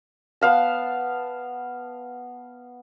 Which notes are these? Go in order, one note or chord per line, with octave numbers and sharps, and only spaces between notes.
B3 F5 A5